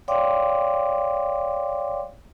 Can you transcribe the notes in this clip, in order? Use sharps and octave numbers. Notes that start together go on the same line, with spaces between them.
C#5 D5 F5 G5 C6 D6